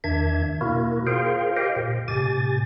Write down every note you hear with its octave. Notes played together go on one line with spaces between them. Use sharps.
E2 D#3 D4 E5 G#6
B2 A#3 E4 F#4 A#4
F4 G#4 A#4 C5 F5 G5
G4 A#4 C5 D#5 F5 G5
A#2
A2 C3 G4 G#5 A6